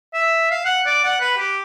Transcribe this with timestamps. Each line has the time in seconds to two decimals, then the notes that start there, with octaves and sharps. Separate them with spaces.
0.14 E5
0.51 F5
0.65 F#5
0.86 D5
1.05 F#5
1.21 B4
1.37 G4